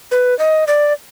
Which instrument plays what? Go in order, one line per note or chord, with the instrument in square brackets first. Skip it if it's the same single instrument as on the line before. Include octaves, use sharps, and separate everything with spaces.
[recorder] B4
D#5
D5